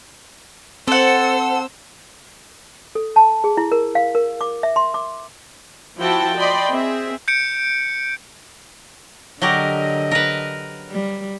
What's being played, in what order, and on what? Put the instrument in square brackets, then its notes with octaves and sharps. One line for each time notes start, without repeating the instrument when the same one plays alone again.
[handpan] C4 [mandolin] A4 F#5 [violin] C5 E6
[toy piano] A4
A5
G#4
E4
A#4
F5
A#4
D6
E5
C6
D6
[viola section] F3 E4 F#4 G5 A5
D5 D#5 G5 B5 C6
C4 G#4 E5
[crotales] G6 C#7 D7
[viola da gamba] D3 D#5 [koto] F#3 G4 A#4
[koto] A#4 B4
[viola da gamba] G3